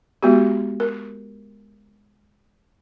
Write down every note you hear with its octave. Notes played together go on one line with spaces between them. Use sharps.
G#3 B3 F#4 G4
A#4